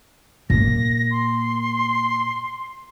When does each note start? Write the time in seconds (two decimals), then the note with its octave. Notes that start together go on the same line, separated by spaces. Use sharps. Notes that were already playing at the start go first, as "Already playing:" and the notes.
0.50 A#2 A#3 A#6
1.11 C6